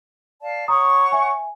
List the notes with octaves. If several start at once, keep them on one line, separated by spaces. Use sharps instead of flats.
D5 F5 A5
C#5 F#5 A#5 C#6 D#6
E5 G#5